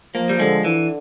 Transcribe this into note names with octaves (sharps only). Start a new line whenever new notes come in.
F3 A#3
G3
D3 G#3
D3 E3